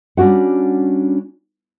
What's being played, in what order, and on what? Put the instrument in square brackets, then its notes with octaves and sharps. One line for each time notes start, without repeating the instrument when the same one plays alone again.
[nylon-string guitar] G3 C#4 D4 F#4 F#5